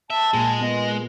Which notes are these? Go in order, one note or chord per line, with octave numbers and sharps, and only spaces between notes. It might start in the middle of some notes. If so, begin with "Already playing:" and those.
E5 A5
A#2 G#3 G#4
B3 D#5